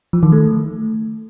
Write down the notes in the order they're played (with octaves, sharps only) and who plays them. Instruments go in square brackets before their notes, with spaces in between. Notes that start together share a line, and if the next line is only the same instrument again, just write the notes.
[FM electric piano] F3
D#3
A3